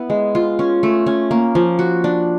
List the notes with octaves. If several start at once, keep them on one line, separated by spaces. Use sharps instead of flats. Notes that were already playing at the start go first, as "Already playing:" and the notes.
Already playing: B3 E4
G#3
F4
C#4
A3
C#4
A#3
F3
F#4
D4